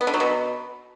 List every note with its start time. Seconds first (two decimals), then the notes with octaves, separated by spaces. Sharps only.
0.01 B3
0.07 D3
0.14 F#3
0.20 B2